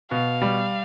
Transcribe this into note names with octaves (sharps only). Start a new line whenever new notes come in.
B2 F5
G3